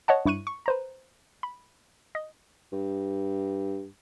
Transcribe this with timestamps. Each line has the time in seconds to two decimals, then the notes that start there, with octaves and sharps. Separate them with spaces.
0.08 C#5 D#5 F#5 A5
0.25 G2 E4 C#6 F#6 D#7
0.47 C#6
0.66 B4 C5 A#5
1.43 B5
2.15 D#5
2.72 G2